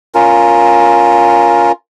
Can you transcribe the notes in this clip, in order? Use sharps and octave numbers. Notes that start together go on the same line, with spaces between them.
C#4 F4 A#4